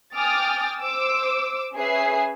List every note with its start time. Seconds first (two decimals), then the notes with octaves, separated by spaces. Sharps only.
0.16 G5 G#5 D6 D#6 F6 A6
0.81 C5 D6 E6
1.74 C#4 G#4 B4 E5 C7